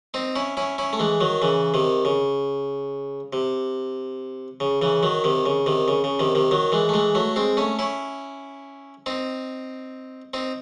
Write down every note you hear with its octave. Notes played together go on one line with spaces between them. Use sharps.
C4 D#4
C#4 E4
C#4 E4
C#4 E4
A3
E3 G#3
D#3 F#3
C#3 E3
C3 D#3
C#3
C3
C#3
C#3 E3
D#3 F#3
C3 D#3
C#3
C3 D#3
C#3
C#3
C3 D#3
C3 D#3
D#3 F#3
E3 G#3
A3
E3 G#3
F#3 A3
G#3 C4
A3 C#4
C#4 E4
C4 D#4
C4 D#4